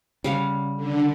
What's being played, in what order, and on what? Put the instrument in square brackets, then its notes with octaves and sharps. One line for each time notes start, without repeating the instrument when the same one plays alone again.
[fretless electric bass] C#3 [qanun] G3 F5 F#5
[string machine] D3